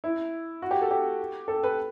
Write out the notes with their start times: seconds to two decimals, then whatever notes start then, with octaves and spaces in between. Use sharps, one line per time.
0.04 E4
0.62 F#4
0.71 G4
0.81 A4
0.91 G4
1.48 A4
1.63 B4